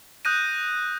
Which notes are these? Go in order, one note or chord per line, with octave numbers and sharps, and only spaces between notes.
D#6 F#6 G6 A#6 D#7